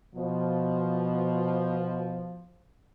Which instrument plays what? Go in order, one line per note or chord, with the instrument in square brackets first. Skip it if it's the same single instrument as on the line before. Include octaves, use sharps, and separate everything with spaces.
[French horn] B2 [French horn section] F3